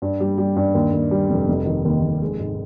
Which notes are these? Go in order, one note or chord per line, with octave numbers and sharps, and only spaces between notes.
G2
G3
G3
G2
D#2
D#2
G3
F1
F1
D#3
D#2
F1
G#3
G#2